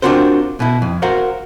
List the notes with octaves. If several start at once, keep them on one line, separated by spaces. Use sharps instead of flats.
C4 D4 F4 F#4 A#4 C5
B2 E4
F2
F#4 A#4 C5 F5 F#5